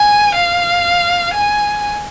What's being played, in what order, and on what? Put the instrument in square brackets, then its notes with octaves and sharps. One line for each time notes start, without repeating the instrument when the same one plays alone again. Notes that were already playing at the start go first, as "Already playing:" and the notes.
Already playing: [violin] G#5
F5
G#5